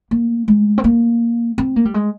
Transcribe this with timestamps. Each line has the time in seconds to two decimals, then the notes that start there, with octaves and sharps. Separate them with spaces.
0.11 A#3
0.48 G#3
0.78 C4
0.84 A#3
1.58 C4
1.76 A#3
1.85 G3
1.94 G#3